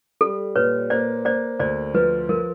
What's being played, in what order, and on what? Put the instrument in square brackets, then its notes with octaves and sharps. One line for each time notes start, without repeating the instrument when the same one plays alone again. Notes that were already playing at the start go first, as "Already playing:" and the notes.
[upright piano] G3 [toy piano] A4
[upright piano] A#2 [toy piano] B4 C#5
[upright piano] A#3 [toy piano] C5 D5
[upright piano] A#3 [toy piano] C5 D5
[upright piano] D2 [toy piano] C5 D5
[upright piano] F3 [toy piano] B4
[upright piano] F3 [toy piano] A#4